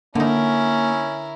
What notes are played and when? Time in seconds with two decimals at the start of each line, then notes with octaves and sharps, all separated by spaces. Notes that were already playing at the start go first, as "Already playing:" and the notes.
0.15 D3 A#3 C#4 D#4 E4 A#4